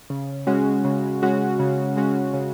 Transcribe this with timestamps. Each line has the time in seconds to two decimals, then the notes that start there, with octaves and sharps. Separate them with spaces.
0.10 C#3
0.47 G#3 C#4 F#4
0.84 C#3
1.22 G#3 C#4 F#4
1.59 C#3
1.97 G#3 C#4 F#4
2.34 C#3